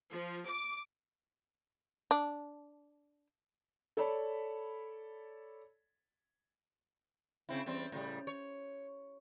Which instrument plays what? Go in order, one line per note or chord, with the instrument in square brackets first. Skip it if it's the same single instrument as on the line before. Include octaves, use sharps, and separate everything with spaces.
[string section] F3
D6
[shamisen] D4
[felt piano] A4 C#5 D5 A5 B5
[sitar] C#3 C4 E4
E2 G3 C4
A2 C#3 G3
C#5